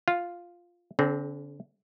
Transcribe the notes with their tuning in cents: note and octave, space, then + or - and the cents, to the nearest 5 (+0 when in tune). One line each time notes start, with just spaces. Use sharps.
F4 +0 F5 +0
D3 -35 C4 +0 G#4 +35